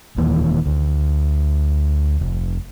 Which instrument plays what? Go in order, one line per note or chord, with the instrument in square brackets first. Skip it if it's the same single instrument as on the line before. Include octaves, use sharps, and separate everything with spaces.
[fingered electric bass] D#1 D#2 E3 A#3
D2
F1